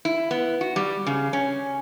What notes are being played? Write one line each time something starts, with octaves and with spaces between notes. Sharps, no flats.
E4
B3
F#4
G3
C#3
C#4